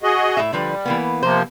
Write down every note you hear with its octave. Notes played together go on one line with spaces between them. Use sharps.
F#4 G#4 D#5
A2 E5
D3 F3 G3 B4
E3 A#3 B3
C3 F3 A#3 C5